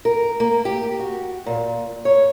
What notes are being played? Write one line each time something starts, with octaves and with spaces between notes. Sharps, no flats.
A#4
A#3
G4
F#4
A#2
C#5